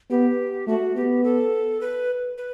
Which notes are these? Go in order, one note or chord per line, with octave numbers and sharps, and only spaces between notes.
B3 G4
A3 F#4
B3 G4
A4
B4
B4